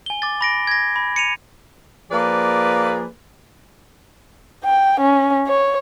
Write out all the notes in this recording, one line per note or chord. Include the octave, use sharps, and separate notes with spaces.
G#5 G7
D6 A6
B5 A#6 D7
G#6 A#6
B5
C#7 D#7 F7
F3 A#3 G#4 B4 D5
G5
C#4
C#5